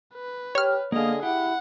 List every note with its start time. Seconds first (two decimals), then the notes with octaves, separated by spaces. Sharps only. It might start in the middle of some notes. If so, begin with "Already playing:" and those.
0.15 B4
0.55 G4 C#5 F6
0.92 D3 A#3 B3 G#4 D#5 F5
1.23 E4 G4 F#5